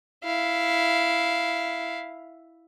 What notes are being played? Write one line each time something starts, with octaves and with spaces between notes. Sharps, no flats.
E4 F5